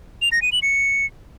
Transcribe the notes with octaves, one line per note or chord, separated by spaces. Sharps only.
F7
A#6
D#7
F#7
C#7